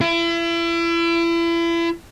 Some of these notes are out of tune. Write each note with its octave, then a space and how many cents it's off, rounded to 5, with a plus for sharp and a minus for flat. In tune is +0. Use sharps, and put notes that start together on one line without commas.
E4 +35